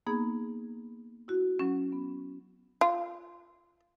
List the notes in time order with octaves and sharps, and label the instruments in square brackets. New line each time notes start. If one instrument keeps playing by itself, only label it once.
[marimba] A#3 B3 D#4 G#4
E4 F#4
F#3 C#4
B3
[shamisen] F4